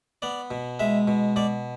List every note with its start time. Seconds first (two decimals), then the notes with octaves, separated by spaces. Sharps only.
0.22 B3 D5
0.51 B2
0.79 G#3 E5
1.08 B2
1.36 B2 D5